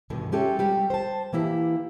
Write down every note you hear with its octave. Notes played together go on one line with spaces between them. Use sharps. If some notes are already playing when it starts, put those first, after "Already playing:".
E2 G2 B2 D3 D#3
G#3 C#4 G4 A4 E5
G3 C4 G4
C5 A5
E3 A#3 E4 G4